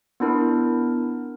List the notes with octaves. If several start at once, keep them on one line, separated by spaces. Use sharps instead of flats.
B3 D4 E4 A#4